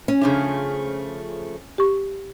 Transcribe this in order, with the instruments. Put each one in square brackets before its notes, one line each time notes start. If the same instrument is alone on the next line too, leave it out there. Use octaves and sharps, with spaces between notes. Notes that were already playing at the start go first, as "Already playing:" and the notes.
[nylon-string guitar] C#4
[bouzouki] C#3 F3 A3 [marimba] D4
[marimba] G4 C#6